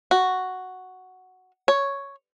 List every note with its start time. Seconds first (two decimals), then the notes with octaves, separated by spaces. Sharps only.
0.11 F#4
1.68 C#5